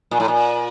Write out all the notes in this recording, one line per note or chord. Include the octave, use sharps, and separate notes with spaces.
A#2
A2
A#2